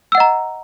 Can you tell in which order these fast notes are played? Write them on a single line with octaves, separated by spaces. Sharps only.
E6 F#5 D#5 A#5